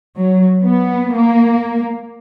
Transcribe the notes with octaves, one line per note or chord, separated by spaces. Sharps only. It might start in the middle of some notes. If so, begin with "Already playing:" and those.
F#3
B3
A#3